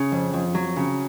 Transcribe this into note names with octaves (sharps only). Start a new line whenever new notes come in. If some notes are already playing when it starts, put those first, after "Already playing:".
Already playing: C#3
F2
F2
F#3
C#3